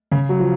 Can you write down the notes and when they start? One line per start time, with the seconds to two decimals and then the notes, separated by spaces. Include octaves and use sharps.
0.12 C#3
0.29 F#3
0.39 F3